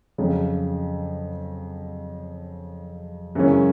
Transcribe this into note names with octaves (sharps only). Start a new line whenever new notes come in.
F2 C#3 F#3
F#2 C#3 E3 G#3 C#4